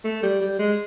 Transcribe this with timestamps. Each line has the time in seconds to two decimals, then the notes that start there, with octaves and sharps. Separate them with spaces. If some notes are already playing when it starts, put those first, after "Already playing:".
0.04 A3
0.22 G3
0.41 G3
0.59 G#3